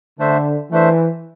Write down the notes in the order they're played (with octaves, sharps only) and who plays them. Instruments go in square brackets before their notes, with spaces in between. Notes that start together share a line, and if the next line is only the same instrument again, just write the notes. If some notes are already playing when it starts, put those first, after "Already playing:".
[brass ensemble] D3 [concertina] A3 D4 C5 E5
[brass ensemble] E3 [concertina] A3 D4 C5 E5